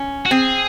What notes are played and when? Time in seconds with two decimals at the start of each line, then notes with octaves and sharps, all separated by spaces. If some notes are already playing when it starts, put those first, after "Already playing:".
Already playing: C#4
0.26 F#4
0.31 C4 G#4